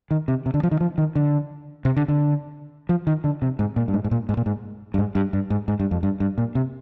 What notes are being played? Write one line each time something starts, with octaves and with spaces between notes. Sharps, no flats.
D#3
C3
C3
D3
F3
D#3
F3
D#3
D3
C3
D3
D3
F3
D#3
D3
C3
G#2
A#2
G2
G#2
G#2
A#2
G#2
A#2
G#2
G2
G#2
G2
G2
G#2
G#2
G2
F2
G2
G2
A#2
C3